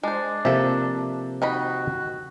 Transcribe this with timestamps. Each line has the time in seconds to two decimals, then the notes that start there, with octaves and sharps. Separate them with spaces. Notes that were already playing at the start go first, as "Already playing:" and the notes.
0.03 G#3 D4 C5
0.45 C3 F3 A#3 A4 E5
1.42 D#3 F#4 D#5 B5